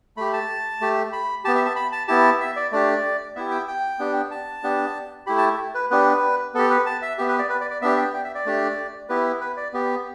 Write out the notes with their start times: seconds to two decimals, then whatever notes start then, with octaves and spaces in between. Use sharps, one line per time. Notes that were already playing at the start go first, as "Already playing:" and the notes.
0.17 A3 G4 B5
0.33 A5
0.81 A3 G4
1.13 B5
1.45 G4 A5
1.48 B3
1.55 E5
1.66 A5
1.76 B5
1.92 A5
2.08 B3 E4 G4 A5
2.40 E5
2.56 D5
2.72 A3 D4 G4 D5
3.36 B3 E4 G4 E5
3.51 G5
3.68 G5
3.99 B3 D4 G4
4.31 A5
4.63 B3 D4 G4
5.27 A3 E4 G4 B5
5.38 A5
5.75 B4
5.91 B3 D4 G4 B4
6.54 B3 G4 A4
6.70 B4
6.86 A5
7.02 E5
7.18 B3 G4 E5
7.29 B4
7.39 D5
7.50 B4
7.61 D5
7.71 D5
7.82 B3 D4 G4 E5
7.98 G5
8.14 G5
8.24 E5
8.35 D5
8.46 A3 D4 G4
9.09 B3 E4 G4 B4
9.41 B4
9.57 D5
9.73 B3 G4